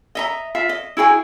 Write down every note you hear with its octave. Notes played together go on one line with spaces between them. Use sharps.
D#5 E5 A#5
F4 E5 F5
D#5
E4 F#4 G#4 G5